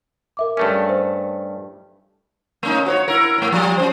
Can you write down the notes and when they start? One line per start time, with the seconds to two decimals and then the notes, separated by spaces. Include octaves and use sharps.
0.37 A#4 E5 D6
0.57 G2 A3 C#4
0.89 C5
2.63 A3 C#4 D#4
2.86 F#4 C5 C#5
3.08 E4 A#4
3.38 A2 A3
3.52 F3 G3
3.77 C#4 D4 C5